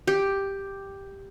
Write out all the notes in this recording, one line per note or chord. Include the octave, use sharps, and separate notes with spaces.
G4